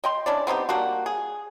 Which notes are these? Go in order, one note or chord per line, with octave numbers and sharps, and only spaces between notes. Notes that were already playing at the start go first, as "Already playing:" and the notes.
D#5 G5 C6
C#4 D4 E4 D5
B3 C4 D#4 G4
G3 A#3 D4 F#4
G#4